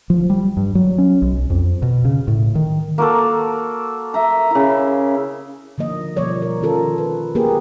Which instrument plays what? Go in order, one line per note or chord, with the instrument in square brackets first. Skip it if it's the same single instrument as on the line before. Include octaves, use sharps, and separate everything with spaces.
[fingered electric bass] F3
G3
G2
F#3
C#4
B1
F2
B2
C#3
A2
D#3
[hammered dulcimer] A#3 F#4 A4
E5 A#5
C#3 E4
[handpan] D3 F3 A#3 D#5
B2 F3 G3 A#3 C#5 D5
A#4
D#3 F3 C#4 F4 A4 A#4
B4
A#3 B3 G4 G#4 A#4 B4